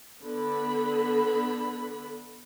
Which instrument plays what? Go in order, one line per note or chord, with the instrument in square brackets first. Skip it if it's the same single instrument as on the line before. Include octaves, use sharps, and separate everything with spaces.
[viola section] D3 B3 A4 B5